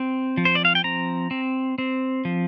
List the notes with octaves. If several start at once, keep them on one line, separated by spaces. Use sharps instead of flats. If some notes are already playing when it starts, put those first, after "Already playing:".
Already playing: C4
F3
C5
D5
F5
G5
C4 A#5
C4
C4
F3